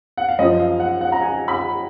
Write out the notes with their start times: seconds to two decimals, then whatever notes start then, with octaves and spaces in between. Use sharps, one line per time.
0.17 F#5
0.29 F5
0.39 F#2 F3 D#5
0.60 F5
0.80 F#5
1.01 F#5
1.12 A#5
1.22 G#5
1.48 B5